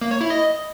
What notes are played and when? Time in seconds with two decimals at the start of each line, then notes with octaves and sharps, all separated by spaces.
0.01 A#3
0.11 C#5
0.21 E4
0.30 D#5